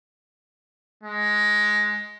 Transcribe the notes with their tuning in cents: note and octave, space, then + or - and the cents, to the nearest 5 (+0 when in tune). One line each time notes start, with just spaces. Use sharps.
G#3 +10